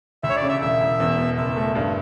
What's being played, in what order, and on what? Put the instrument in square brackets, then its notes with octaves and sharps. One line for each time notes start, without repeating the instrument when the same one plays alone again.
[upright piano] D2 [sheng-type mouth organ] E5
[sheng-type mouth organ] C#5
D5
[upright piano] C#3
[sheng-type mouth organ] E5
[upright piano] E1 [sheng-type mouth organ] E5
[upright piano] E1
E2
B2
[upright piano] F#1 [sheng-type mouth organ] E5
[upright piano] A3
G2